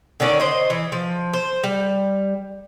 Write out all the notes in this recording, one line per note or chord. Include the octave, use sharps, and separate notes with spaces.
D3 D#3 C#4 D5
C5 D#5
E3
F3
C5
G3